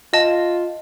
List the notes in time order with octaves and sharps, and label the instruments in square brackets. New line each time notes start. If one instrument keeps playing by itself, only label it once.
[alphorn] F4 [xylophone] D#5 A5